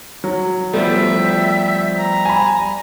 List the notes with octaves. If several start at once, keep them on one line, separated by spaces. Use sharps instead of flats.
F#3
F3 G3 A3 B3 E5
A#5
G#5 B5